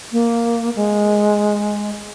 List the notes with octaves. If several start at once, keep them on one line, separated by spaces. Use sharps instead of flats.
A#3
G#3